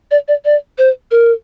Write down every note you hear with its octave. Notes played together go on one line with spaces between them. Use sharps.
D5
D5
D5
C5
A#4